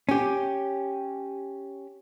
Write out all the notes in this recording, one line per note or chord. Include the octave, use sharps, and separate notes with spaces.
C#4 G4